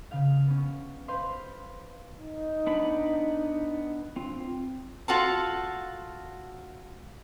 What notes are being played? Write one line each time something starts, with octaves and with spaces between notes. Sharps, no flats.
C#3 F5
B3 C#4
B4 C5 F5 C6
D#4
B3 D4 B5
C4 F4
F4 F#4 A4 A5